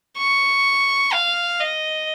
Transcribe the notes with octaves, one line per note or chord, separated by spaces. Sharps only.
C#6
F5
D#5